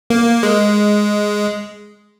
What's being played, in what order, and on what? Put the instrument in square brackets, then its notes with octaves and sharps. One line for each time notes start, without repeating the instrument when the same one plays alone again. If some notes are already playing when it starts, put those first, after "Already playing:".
[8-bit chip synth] A#3
G#3